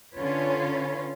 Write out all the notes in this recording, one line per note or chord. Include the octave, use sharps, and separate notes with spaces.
D3 C#4 F4 B4 C#5